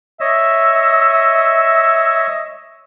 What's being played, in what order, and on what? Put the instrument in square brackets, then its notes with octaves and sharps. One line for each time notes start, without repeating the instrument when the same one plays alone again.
[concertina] C#5 D#5 [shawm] E5